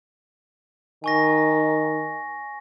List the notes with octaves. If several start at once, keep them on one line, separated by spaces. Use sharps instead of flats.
D#3 G#5 C#6 A#6